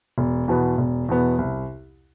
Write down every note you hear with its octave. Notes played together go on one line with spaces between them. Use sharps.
E1
E2 B2 B3
E1
E2 B2 B3
C2